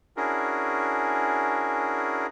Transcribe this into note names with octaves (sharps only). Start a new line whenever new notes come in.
C#4 D4 E4 F#4 G#4 A#4